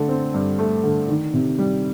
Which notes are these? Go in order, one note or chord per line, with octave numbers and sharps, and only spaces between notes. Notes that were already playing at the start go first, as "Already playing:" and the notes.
Already playing: D3 A3
C4
G2
A3
D3
D#3
C3
G3